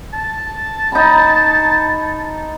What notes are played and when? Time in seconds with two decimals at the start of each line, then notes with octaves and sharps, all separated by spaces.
0.14 A5
0.92 D#4 A#5 B5